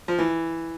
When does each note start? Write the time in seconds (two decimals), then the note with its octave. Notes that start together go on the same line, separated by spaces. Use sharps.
0.08 F3
0.18 E3